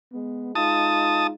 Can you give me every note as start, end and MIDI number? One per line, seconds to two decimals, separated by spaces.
0.13 0.54 56
0.13 0.54 59
0.55 1.31 56
0.55 1.31 63
0.55 1.31 65
0.55 1.27 81
0.55 1.27 87